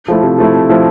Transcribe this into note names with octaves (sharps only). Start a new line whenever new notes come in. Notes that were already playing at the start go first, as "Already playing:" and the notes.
F3 A3 E4
C3
F3 A3 E4
C3
F3 A3 E4